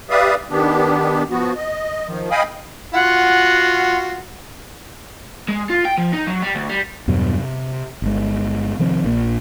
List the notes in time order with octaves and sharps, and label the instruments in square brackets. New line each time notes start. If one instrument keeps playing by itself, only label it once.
[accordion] G4 B4 D5 E5 F5 D#6
D#3 B3 D4 G4
F3 B3 F#4
D#5
D#3 F3
D#5 F5 G5 G#5 B5 D#6
[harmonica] F4 F#4 [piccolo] F#5
[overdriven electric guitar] G#3
F4
G5
F3
D#4
F#3
G3
D2
G3
[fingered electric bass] E2 G2 B2 F#3
C3
G1 G#3
C3 D#3 F3 C4
A#1 A#2 A#3